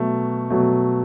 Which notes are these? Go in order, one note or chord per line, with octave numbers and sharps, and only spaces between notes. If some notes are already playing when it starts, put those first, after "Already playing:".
Already playing: B2 F#3 A3
B2 F#3 A3